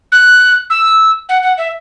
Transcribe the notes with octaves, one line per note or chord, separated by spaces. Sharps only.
F#6
E6
F#5
F#5
E5